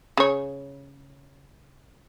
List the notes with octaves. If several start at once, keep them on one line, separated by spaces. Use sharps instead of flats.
C#3 C#5